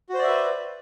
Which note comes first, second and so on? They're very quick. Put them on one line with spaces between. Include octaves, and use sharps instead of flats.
F#4 C5 D5 E5 B4